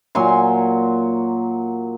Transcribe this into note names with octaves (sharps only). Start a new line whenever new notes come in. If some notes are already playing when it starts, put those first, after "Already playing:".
A#2 F#3 G#5 C6